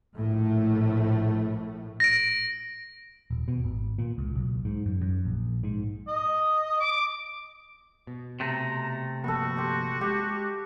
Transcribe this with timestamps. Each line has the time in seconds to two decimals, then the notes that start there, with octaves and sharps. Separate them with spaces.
0.16 A#1 A2 A3
2.00 A#6 D7
3.31 D#1
3.48 B2
3.64 G#1
3.98 A#2
4.18 C#2
4.35 B1
4.65 G#2
4.86 F#2
5.01 F#2
5.25 A#1
5.63 G#2
6.08 D#5
6.80 D6
8.07 B2
8.40 C3 A3 A#5
9.24 G1 F3 A#3 B3 F#4 A4
9.57 G4 C5
10.01 G#3 G4